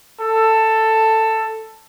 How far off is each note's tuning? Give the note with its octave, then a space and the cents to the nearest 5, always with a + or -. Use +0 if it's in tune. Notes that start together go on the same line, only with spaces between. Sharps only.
A4 +10